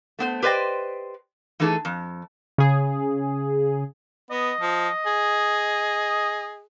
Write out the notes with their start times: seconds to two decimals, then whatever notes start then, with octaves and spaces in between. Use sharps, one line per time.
0.19 A3 B3 C5
0.42 G4 B4 C5 D5 D#5 G5
1.60 E3 A3 D#4 G#4 A4
1.85 F2
2.58 C#3 G#4
4.31 B3 D#5
4.61 F3
5.06 G#4